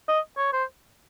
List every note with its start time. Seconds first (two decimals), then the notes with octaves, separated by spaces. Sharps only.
0.09 D#5
0.38 C#5
0.53 C5